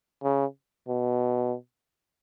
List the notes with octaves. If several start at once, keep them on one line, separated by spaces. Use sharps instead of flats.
C#3
B2